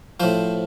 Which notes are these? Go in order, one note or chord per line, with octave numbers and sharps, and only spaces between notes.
A2 F3 C5